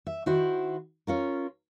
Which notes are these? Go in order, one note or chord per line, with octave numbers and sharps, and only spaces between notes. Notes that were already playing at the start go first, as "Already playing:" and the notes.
E5
D#3 E4 F#4 C5
C#4 F4 A#4